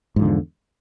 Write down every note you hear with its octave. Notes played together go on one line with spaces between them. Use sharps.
E2 G#2 D3 F3